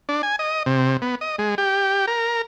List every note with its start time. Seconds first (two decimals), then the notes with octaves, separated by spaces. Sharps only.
0.09 D4
0.23 G#5
0.39 D#5
0.66 C3
1.02 B3
1.21 D#5
1.39 G#3
1.58 G4
2.07 A#4